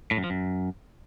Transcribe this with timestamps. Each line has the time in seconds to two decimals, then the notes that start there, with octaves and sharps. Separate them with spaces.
0.11 A2
0.17 F#2
0.24 F3
0.30 F#2